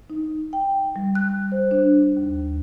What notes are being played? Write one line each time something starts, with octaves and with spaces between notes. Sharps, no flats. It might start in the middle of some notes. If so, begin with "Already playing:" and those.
D#4
G5
G3
F#6
C5
D4
D#2